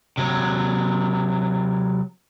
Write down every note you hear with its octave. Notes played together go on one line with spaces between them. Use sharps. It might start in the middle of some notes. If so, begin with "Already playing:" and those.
C3 F#3